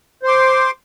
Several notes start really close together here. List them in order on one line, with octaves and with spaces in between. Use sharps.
C5 C6 D6